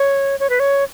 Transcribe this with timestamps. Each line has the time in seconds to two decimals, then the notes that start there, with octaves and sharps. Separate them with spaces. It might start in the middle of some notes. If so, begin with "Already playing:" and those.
Already playing: C#5
0.40 C#5
0.50 B4
0.60 C#5